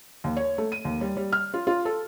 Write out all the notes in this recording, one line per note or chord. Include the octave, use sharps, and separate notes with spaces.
D#2
C#5
A3
D#7
D#2
G3
G3
F6
F4
F4
A4